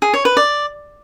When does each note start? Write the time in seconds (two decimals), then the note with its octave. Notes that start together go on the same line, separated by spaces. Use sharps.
0.02 G#4
0.14 C#5
0.25 B4
0.37 D5